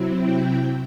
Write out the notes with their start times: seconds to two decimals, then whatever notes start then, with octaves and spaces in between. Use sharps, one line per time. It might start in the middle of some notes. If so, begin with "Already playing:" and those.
Already playing: C3 F#3 C4 E4
0.14 G5